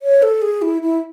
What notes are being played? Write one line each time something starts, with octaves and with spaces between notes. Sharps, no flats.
C#5
A4
G#4
E4
E4